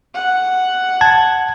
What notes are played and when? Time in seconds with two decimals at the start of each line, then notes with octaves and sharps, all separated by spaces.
0.14 F#5
1.01 A5 G#6